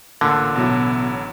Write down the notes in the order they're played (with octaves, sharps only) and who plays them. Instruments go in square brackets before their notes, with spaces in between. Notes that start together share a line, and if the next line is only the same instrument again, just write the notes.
[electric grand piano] A1 A#2 [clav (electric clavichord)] D3
[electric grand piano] A1 F#3 E4 [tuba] B2